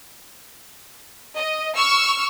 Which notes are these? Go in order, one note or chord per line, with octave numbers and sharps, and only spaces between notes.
D#5
C#6 E6 F6